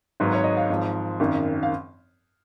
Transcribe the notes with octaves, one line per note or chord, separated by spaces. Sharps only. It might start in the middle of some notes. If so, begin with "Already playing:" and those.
G#1 G#2 F#3 B4
C#5
D#5
F5
G#1 G#2 F3
G#1 F#2 D#3
F5